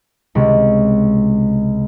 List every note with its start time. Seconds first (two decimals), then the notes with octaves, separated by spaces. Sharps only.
0.35 C#2 C3